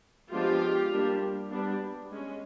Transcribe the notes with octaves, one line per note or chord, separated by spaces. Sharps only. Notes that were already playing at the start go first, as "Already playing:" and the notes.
F3 G#3 B3 D4 F4 G4
G3 A#3 D4
G3 B3 D4
G#3 C#4